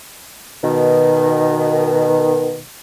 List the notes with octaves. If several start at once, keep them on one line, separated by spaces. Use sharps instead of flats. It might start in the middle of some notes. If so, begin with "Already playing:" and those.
B2 D#3